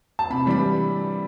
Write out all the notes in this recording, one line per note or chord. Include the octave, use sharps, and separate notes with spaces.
A5
C3 B5
E3 G3 D4 B5